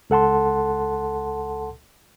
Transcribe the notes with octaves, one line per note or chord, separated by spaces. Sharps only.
C#2 A4 F#5 A5 C6